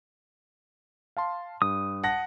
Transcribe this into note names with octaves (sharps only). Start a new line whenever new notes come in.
F5 A5 C6
G2 D#6
F#5 A5 A#6